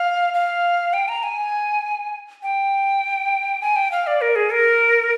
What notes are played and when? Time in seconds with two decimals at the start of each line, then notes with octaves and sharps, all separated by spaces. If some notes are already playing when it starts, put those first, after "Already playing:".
Already playing: F5
0.34 F5
0.93 G5
1.08 A#5
1.23 G#5
2.43 G5
3.61 G#5
3.76 G5
3.92 F5
4.07 D5
4.21 A#4
4.36 G#4
4.51 A#4